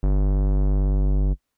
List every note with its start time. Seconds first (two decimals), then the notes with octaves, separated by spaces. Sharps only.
0.03 G1